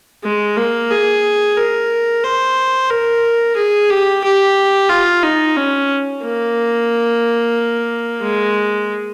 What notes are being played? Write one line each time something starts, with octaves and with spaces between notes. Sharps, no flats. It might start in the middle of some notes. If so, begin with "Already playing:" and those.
G#3
A#3
G#4
A#4
C5
A#4
G#4
G4
G4
F4
D#4
C#4
A#3
G#3